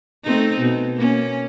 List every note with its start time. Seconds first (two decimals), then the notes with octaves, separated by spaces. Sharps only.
0.24 A3 C4 D#4
0.59 B2
0.96 A#3 C#4